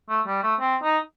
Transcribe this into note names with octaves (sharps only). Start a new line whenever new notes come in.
A3
G3
A3
C4
D#4